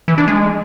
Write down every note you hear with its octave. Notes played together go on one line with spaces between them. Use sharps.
E3
D4
G#3